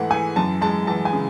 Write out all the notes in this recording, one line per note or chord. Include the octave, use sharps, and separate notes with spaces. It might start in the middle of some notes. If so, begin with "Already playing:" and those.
Already playing: G#2 E3 A3 F#5
E3 G#5
F#2 A5
G#3 A5
E3 A5
G#5
C#3